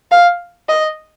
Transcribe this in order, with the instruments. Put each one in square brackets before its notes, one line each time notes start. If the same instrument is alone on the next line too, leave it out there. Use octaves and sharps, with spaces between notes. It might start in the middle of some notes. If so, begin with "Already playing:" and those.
[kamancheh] F5
D#5